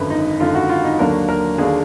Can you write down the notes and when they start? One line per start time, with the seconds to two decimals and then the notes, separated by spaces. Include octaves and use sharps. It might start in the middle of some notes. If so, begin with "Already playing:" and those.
Already playing: G#1 F#2 D3 B4
0.10 D#4
0.40 G#1 F#2 D3 F4
0.55 F#4
0.69 F4
0.84 D#4
0.99 D#2 D3 F#3 A#3 D4 A#4
1.29 A#4
1.58 D#2 D3 F#3 A#3 D4 G#4